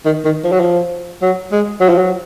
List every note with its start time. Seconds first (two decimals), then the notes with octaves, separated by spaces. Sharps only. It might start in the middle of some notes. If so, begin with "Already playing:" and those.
0.05 D#3
0.25 D#3
0.44 F3
0.52 F#3
0.60 F3
1.22 F#3
1.52 G#3
1.81 F#3
1.89 F3
1.98 F#3